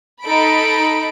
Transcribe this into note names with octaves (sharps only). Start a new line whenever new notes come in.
D#4 A4 B5 D7